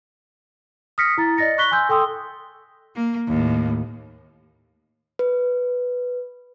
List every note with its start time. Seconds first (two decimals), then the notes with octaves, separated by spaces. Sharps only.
0.98 D#6 F6 A#6 B6 C#7
1.18 E4 A#5 A6
1.37 D5 D#5 A6 A#6 C#7
1.58 B5 C#6 F#6 A#6 B6 G7
1.71 G#5 C6 E6 G6
1.89 A4 G5 C6 D#6 E6
2.96 A#3
3.27 D#2 A2
5.19 B4